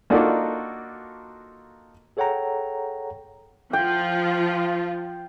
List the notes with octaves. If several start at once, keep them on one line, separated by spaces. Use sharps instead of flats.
A#3 D4 D#4 F4 F#4 A4
G#4 A4 C#5 F#5 G5 A#5
F3 F4 G5